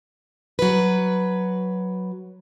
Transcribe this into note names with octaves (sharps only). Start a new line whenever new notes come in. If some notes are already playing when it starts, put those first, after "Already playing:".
F#3 B4